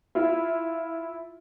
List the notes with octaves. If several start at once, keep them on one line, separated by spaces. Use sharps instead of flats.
E4 F4